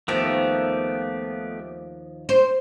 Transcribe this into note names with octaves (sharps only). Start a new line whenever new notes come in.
D#2 D#3 F3 A3 B3 G4
C5